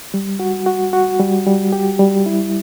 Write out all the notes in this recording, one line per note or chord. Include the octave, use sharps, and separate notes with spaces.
G3
F#4
F#4
F#4
G3
G3
G4
G3
E4